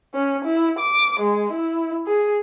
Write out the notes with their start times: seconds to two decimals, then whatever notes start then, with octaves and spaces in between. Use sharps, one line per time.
0.14 C#4
0.45 E4
0.79 D6
1.20 G#3
1.53 E4
2.07 G#4